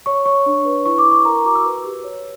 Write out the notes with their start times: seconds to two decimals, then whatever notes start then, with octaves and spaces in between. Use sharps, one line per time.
0.06 C#5 C#6
0.26 C#5 C#6
0.46 D4
0.65 B4
0.85 E4 C#6
0.98 D6
1.05 E4
1.11 C#6
1.25 A#4 A#5
1.35 C#6
1.45 F#4 D6
1.55 E6
1.65 B4
1.84 G4
2.04 C#5